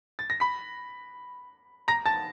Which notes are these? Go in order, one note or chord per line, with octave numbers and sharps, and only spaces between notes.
A6
A#6
B5 B6
A#5 A#6
A5 A6